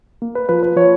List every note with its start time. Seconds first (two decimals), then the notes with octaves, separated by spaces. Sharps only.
0.22 A#3
0.35 B4
0.49 F3 B4
0.63 B4
0.76 F3 C#5